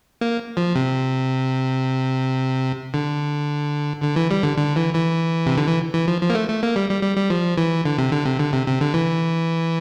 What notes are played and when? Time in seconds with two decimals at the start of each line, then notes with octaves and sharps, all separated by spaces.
0.21 A#3
0.57 F3
0.75 C3
2.94 D3
4.02 D3
4.16 E3
4.31 G3
4.43 D3
4.58 D3
4.76 E3
4.95 E3
5.46 C3
5.57 D3
5.67 E3
5.94 E3
6.08 F3
6.21 F3
6.30 A#3
6.35 A3
6.49 A3
6.63 A#3
6.76 G3
6.90 G3
7.03 G3
7.17 G3
7.30 F3
7.57 E3
7.85 D3
7.98 C3
8.12 D3
8.25 C3
8.39 D3
8.53 C3
8.67 C3
8.81 D3
8.94 E3